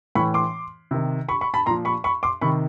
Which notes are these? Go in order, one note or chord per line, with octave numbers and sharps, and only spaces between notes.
A2 E3 B5 C#6
C6 D6
C3 D#3
B5 C#6
B5 C#6
A5 B5
A#2 F3 A#5 C6
B5 C#6
B5 C#6
C6 D6
C3 D#3 B5 C#6